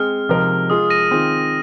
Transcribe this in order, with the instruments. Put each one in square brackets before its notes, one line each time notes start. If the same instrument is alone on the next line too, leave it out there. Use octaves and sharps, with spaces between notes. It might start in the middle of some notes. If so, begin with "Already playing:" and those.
Already playing: [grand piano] G#3 C4 G#4 [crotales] F6
[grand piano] C3 F3 G#3 D#4 A#4
[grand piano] G#3 F4 G#4 [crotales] D#6
[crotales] A#6 D#7
[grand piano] D#3 C4 F4 G#4